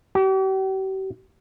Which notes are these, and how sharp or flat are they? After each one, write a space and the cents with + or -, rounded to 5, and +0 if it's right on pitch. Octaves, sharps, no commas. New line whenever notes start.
G4 -45